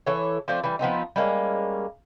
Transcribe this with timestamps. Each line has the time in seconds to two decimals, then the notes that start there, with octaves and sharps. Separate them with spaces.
0.07 E3 A4 C#5
0.48 F3 A3 C4 D4
0.64 E3 G3
0.79 F3 B3 C4 D#4
1.16 G3 G#3 A#3 C#4